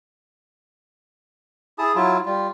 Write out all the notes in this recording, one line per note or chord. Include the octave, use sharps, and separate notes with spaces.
E4 G#4 A5 D#6
F#3 E4 F4
G3 F4